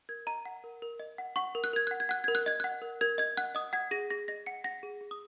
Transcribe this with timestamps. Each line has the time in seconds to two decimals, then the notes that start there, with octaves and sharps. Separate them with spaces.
0.09 A#4 G#6
0.27 D#5 A#5
0.45 F#5
0.64 A#4
0.82 A#4
1.00 D#5
1.18 F#5
1.36 F#5 C#6
1.55 A#4
1.64 F#6
1.73 A#4 G#6
1.87 F#5 F#6
2.00 G#6
2.09 F#5 F#6
2.24 A#4 G#6
2.35 F#6
2.46 D#5 G#6
2.60 F#5 F#6
2.82 A#4
3.01 A#4 G#6
3.18 D#5 G#6
3.37 F#5 F#6
3.55 D#5 D#6
3.73 F#5 G#6
3.91 G#4 A#6
4.10 G#4 A#6
4.28 D#5 A#6
4.46 F#5 C#7
4.64 F#5 A#6
4.83 G#4
5.01 G#4
5.11 D#6